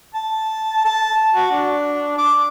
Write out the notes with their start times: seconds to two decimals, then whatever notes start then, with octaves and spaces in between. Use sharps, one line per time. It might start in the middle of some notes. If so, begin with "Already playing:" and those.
0.14 A5
0.85 A5
1.34 F#4
1.52 D4
2.18 D6